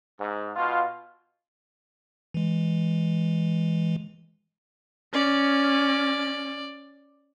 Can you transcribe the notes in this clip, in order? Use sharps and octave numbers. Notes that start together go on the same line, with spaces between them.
G#2
B2 F4
E3 G#3
C#4 D5